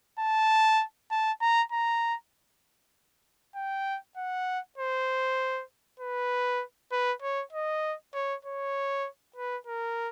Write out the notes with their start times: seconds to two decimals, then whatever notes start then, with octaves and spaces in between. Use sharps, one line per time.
0.20 A5
1.11 A5
1.42 A#5
1.72 A#5
3.56 G5
4.17 F#5
4.78 C5
6.00 B4
6.92 B4
7.23 C#5
7.53 D#5
8.15 C#5
8.45 C#5
9.36 B4
9.67 A#4